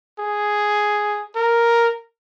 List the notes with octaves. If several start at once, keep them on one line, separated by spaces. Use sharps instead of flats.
G#4
A#4